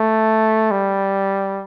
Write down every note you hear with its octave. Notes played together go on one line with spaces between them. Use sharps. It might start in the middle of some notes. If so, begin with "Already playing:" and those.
Already playing: A3
G3